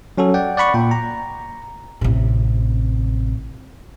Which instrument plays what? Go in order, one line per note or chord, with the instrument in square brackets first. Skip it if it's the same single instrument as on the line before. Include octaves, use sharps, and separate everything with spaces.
[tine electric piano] F#3 C#4 F#4 A4
D5 F#5 G5
D5 F#5 B5 C#6
A#2 G5
A#5
[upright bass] A1 C3